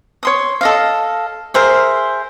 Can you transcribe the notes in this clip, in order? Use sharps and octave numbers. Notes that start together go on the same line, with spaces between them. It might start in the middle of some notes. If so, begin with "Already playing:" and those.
C#5 C6 D#6
A4 D#5 F5
G#4 A#4 C5 E5